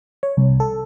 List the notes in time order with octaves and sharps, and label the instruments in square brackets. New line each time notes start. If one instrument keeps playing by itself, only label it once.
[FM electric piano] C#5
C2
A4